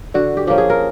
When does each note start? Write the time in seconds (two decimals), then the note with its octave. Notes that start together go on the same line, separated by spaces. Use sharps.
0.14 D3 F#4
0.37 G4
0.47 F3 A#3 C#4 G4
0.58 G#4
0.70 A#4